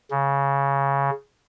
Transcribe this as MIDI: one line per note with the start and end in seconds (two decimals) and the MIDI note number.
0.11 1.10 49